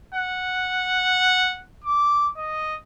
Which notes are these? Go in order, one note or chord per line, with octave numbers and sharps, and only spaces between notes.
F#5
D6
D#5